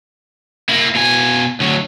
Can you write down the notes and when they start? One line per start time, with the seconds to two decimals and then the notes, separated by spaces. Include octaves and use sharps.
0.69 A#3 E4
0.95 B2 G#5
1.60 D2 F#3